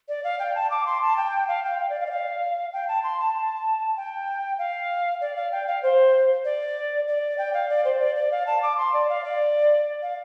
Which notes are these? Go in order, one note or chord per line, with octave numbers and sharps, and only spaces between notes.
D5
F5
G5
A5
D6
C6
A5
G5
F5
G5
F5
D5
F5
D5
F5
G5
A5
C6
A5
A5
G5
F5
D5
F5
G5
F5
C5
D5
D5
G5
F5
D5
C5
D5
D5
F5
A5
D6
C6
D5
F5
D5
F5